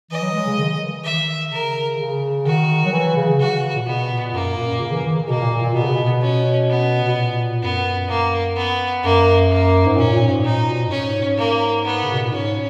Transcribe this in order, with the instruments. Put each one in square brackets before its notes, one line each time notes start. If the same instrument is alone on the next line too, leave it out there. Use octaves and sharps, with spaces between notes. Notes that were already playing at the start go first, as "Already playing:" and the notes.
[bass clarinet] E3 [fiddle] D#5
[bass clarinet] F#3
G#3
C#3
D#3
E3
[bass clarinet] D#3 [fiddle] E5
[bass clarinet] C#3 [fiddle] A#4
[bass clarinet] C#3
[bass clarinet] D#3 [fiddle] F#4
[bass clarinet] F#3
E3
C#3
[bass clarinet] C#3 [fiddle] F#4
[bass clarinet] A#2
[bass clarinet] B2 [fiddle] B3
[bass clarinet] A#2
[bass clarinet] F#2 [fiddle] A#3
[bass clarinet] A#2
C#3
E3
D#3
C#3
[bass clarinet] B2 [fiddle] A#3
[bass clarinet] A#2
A#2
A#2
[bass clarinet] B2 [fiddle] B3
[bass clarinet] C#3
B2
[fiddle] C#4
B3
[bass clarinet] B2
A#2
[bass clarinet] F#2 [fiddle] B3
[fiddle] A#3
B3
[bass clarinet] F#2 [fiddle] A#3
[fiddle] A#3
[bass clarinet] G#2
[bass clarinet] A#2 [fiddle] C#4
[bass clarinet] A#2
G#2
[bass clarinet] A#2 [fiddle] D#4
[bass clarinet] B2
F#2
[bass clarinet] G#2 [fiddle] C#4
[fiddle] A#3
B3
[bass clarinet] C#3
B2
A#2
[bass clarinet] G#2 [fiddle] C#4